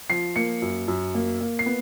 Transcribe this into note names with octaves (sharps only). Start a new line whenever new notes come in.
F3 C7
A#3 C#7
F#2
F#2
A#3
A#3
C7
B3